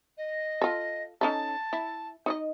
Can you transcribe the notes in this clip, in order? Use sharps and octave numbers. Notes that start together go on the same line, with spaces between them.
D#5
F4 A4
C#4 D#4 A4 A5
E4
D#4 D5 D#5